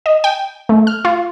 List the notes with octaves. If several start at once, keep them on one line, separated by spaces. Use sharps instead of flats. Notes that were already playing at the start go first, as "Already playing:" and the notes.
D#5
G5
A3
F6
F4